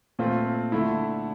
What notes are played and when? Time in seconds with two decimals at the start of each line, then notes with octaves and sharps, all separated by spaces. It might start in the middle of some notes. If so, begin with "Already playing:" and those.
0.19 A#2 A3 C4 F4
0.72 D3 A3 E4